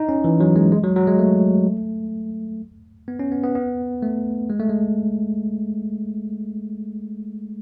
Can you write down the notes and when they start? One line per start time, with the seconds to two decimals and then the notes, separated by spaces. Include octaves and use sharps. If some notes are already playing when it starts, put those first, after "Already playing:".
Already playing: D#4
0.09 C#4
0.24 E3
0.40 F#3
0.56 G#3
0.72 G#3
0.84 F#3
0.96 F#3
1.07 G#3
1.19 A3
3.08 B3
3.19 C#4
3.32 B3
3.43 B3
3.55 B3
4.03 A3
4.50 G#3
4.60 A3
4.69 G#3